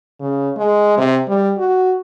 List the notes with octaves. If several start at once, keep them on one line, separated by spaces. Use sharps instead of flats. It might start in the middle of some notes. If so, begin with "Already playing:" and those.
C#3
G#3
C3
G3
F#4